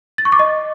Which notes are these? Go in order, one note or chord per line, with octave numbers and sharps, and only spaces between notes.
A6
C#6
D6
D#5